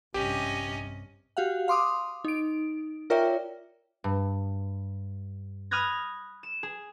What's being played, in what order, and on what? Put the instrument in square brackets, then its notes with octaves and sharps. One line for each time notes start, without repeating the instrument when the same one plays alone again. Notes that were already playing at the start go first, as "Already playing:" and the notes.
[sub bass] A#1 [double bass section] G2 C3 [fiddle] C#4 D#5 [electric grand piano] G4
[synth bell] F#4 G4 F5 F#5
F5 C6 D6 D#6
D#4 D7
F4 A#4 C#5 D5 E5 G5
[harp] G2
B5 D#6 F6 F#6 G#6 A#6
E7
G#4